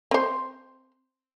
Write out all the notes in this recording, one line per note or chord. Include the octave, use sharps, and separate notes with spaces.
C4 C5